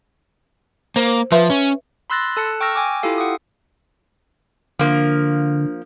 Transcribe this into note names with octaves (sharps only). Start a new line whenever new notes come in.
A#3 C5
F3 B4 E5 C6
C#4
B5 C6 E6 F#6 A6 A#6
A4 A5 F#6 C#7
G5 C#6 E6 F6 A#6
G5 G#5 D6
E4 F4 G4 A4 F5
F#5 G5 D#6
D3 F3 A#3 D4